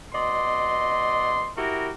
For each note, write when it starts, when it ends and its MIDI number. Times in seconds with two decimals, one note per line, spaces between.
0.13 1.50 47
0.13 1.50 74
0.13 1.50 75
0.13 1.50 84
1.56 1.90 64
1.56 1.90 66
1.56 1.90 67
1.56 1.90 70